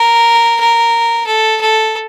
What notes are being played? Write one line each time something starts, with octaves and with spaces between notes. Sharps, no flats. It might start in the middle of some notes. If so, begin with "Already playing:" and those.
Already playing: A#4
A#4
A4
A4